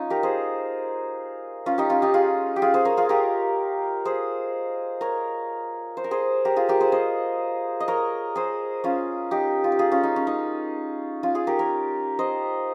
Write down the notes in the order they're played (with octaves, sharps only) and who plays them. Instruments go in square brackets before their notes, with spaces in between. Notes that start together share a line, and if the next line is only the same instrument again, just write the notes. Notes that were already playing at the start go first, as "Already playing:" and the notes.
Already playing: [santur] C#4 D#4 F4
G4 A#4
G#4 C5
C#4 F4
D#4 G4
C#4 F4
D#4 G4
F4 G#4
G4
F4 G#4
G#4 C5
A#4 C#5
F4 G#4
G4 A#4
G#4 C5
A#4 C#5
C5
A#4
G#4 C5
G4 A#4
F4 G#4
G4 A#4
G#4 C5
C5 D#5
D#5
A#4 C#5
G#4 C5
C#4 F4
D#4 G4
F4
G4
F4 G#4
C#4 F4
D#4
C#4
D#4
C#4 F4
F4 G#4
G4 A#4
A#4 C#5
C5 D#5